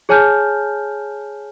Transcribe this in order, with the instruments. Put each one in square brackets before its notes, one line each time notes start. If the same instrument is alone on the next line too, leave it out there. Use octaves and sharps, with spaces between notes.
[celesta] G#4 C#5 G#5 A5 F6 G6